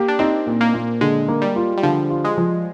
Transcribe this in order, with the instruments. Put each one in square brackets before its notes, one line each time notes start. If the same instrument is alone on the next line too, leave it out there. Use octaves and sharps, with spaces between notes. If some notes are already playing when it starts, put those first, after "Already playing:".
Already playing: [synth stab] A#3 [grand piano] G4
[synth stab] D4
[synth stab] C4 [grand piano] D#4
[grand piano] A#2
[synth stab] A#3
[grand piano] A#2
[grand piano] D3 [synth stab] G#3
[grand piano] A#3
[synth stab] G3
[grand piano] F4
[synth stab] G3
[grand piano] D3 [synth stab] F3
[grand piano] F4
[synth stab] G#3
[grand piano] F3